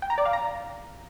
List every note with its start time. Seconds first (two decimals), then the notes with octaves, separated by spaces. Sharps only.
0.02 G5
0.10 A#5
0.18 D5
0.25 F5
0.33 A#5